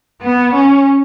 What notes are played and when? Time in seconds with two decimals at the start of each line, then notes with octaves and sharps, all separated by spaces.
0.22 B3
0.54 C#4